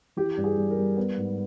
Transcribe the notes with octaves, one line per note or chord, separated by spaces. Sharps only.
E3 G4
G2
G#4
G3
A#4
G3
B3
G#2